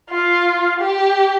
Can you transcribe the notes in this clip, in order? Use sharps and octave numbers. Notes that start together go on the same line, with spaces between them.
F4
G4